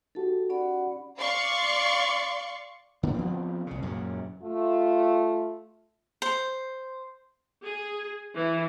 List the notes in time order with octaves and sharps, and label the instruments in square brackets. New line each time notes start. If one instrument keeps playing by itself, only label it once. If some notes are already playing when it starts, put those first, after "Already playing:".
[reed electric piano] D#4 F#4 G4 [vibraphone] A4 A5
[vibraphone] C#4 D5 B5 [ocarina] F#5
[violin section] D5 F5 C6 C#6
[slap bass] D3 B3
F3 B3 C4
C2 C#3
F#2 A#2 C#3
[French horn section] A3 F4
[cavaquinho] C5
[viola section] G#4
E3